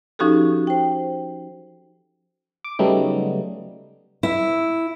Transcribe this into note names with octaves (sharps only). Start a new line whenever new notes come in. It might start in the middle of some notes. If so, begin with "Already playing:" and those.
F3 C#4 D#4 F#4 G4 A4
C5 G5
D6
C#3 F#3 G3 A3 B3 D#4
E4